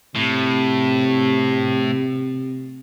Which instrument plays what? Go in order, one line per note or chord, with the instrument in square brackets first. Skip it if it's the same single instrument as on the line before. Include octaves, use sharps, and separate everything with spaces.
[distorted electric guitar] A2 [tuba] C3